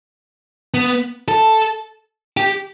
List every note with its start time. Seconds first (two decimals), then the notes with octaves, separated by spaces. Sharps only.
0.74 B3
1.28 A4
2.37 G4